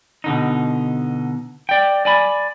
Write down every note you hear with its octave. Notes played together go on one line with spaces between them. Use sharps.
B2 D3 D#4
D5 G5
D5 G#5 B5